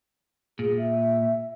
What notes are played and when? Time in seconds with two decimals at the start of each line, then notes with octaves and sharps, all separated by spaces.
0.59 A#2 G#4
0.78 E5